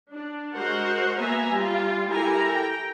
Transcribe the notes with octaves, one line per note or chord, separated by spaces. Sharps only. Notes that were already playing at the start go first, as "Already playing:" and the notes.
D4
G#3 F#4 A#4 C5 F#5
A#3 B3 E5 G#5 A#5
G3 F4
E4 G4 A4 A#4 G#5 A#5
G5 A#5